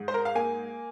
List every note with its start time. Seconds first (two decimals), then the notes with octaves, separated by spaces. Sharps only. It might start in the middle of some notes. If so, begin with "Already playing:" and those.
Already playing: G#2
0.08 C5
0.14 A#4
0.25 F5
0.35 A#3 G#5